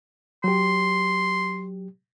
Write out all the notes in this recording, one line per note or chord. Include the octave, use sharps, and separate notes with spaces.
F#3 G4 C6